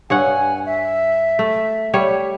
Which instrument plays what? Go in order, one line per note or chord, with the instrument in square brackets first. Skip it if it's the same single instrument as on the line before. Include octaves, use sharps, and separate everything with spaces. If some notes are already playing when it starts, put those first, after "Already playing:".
[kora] G2 C#5 F#5 [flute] G#5
[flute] E5
[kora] A3
G3 C#5